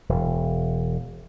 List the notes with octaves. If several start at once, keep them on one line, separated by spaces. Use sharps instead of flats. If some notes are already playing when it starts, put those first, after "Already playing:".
E1